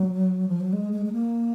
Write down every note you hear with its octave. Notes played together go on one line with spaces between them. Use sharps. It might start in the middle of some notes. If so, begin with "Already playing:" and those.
Already playing: F#3
F3
F#3
G#3
G#3
G#3
A#3